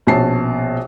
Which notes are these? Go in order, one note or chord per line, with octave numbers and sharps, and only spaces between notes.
A#1 B2 C#4 A5 C7